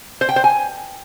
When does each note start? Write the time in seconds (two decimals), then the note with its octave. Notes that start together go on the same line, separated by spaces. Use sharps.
0.21 C5
0.29 G5
0.36 C5
0.44 G#5